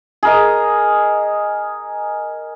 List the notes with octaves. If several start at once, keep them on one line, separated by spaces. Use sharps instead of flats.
G#4 A#4 D#5